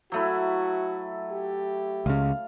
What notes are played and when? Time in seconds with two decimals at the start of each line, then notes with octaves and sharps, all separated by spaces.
0.12 F#3 A3 E4 F#4
1.32 G4
2.06 C#2 C#3 F5